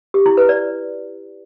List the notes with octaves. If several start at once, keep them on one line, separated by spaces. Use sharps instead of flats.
G4
E4
B4
D5